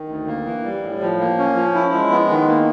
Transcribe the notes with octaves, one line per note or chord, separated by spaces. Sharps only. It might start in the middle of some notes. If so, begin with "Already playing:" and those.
Already playing: D#3
D2
A#3
E3
G3
A2
F3
A#3
C#4
F3
E4
G#3
B3
D#3
A#3